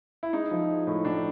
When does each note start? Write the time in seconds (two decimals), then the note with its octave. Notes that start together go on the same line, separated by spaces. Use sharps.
0.23 E4
0.33 G#3 D#4
0.51 F3
0.69 G#3
0.87 A2
1.04 A2 D4